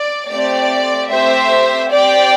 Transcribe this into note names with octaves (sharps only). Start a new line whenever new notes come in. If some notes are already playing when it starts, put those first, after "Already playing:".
Already playing: D5
A3 C4 G4 D5
A3 C4 G4 C5 E5
C4 G4 D5 G5